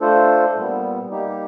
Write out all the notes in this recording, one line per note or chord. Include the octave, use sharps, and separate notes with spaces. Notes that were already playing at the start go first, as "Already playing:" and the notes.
A3 D4 F4 A4 C5
A#2 G3 B3
G3 A#3 D#4 G4